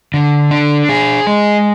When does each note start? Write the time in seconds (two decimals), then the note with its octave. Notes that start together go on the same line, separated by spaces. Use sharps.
0.14 D3
0.51 D4
0.89 G#4
1.27 G#3